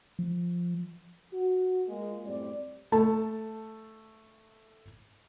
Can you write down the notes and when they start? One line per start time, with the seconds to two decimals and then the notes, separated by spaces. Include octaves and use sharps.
0.19 F3
1.33 F#4
1.88 G#3 A#3 F4
2.25 F#2 A2 G3 C4 D5
2.92 A3 A5